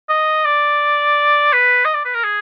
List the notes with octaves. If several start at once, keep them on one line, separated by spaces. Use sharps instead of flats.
D#5
D5
B4
D#5
D5
B4
A#4
G#4